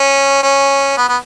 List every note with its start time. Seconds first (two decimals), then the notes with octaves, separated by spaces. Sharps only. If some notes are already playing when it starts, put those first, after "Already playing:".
Already playing: C#4
0.43 C#4
0.98 B3
1.09 B3